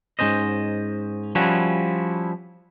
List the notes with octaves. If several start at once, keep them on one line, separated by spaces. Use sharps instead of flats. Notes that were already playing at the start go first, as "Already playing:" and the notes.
G#2 E3 C#4 C5 D#5
F3 G3 C#4 E4 F#4